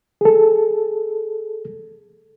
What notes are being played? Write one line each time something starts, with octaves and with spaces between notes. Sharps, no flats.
G#4 A4